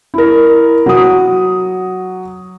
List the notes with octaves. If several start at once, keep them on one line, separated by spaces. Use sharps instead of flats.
E4 A#4
F#3 D#6